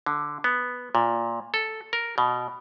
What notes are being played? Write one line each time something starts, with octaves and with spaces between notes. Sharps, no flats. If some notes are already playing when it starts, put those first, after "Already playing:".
D3
B3
A#2
A4
A#4
B2